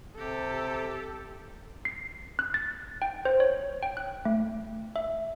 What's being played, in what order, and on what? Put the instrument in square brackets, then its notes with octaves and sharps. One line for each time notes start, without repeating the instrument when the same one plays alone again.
[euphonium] C3 [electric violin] G4 [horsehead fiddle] A4
[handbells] C7
F#6
A6
G5
C5
C#5
G5
F#6
A3
E5